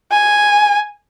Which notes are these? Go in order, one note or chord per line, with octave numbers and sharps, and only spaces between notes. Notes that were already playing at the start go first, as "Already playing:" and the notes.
G#5